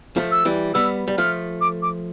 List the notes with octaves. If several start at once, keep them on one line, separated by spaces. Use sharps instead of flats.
F3 A3
E6
E3 G3
G3 B3 E6
G3
F3 A3 F6
D6
D6